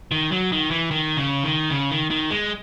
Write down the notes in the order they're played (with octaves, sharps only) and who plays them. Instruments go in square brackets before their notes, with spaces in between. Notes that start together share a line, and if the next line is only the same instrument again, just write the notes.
[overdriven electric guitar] D#3
F#3
D#3
E3
D#3
C#3
D#3
C#3
D#3
D#3
G#3